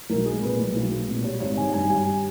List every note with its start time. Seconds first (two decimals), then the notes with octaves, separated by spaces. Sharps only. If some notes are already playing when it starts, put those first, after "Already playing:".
0.09 B1 A#4
0.26 G#3 G#4
0.42 A#2 B4
0.59 B1
0.75 B1
0.92 G#3
1.08 A#2
1.24 G3 C#5
1.40 G#1 C#5
1.57 D#3 G#5
1.73 G2 G#5
1.89 G3 G#5